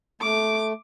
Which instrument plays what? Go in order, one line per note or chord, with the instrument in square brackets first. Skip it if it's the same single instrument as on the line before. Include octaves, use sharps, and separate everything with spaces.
[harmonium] A3 [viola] D6